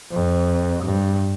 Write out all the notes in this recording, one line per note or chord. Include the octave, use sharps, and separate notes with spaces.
F2
G2